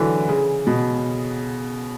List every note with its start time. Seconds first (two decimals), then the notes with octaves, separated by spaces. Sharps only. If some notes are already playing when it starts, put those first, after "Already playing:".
Already playing: D3 E3 F#3
0.29 C#3
0.67 B2